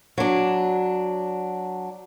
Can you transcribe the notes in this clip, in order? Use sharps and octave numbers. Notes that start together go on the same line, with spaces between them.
F#3 D4